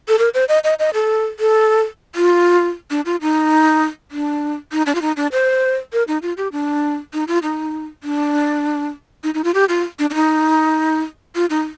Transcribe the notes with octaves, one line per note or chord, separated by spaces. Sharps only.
A4
A#4
C5
D#5
D#5
D#5
A4
A4
F4
D4
F4
D#4
D4
D#4
D4
F4
D#4
D4
C5
A#4
D#4
F4
G4
D4
D#4
F4
D#4
D4
D#4
D#4
F4
G4
F4
D4
D4
D#4
F4
D#4